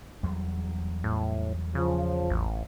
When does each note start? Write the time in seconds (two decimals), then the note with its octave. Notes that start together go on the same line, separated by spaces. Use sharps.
0.23 E2 F#3 G3
1.04 A2
1.75 C#3 F3
2.30 A1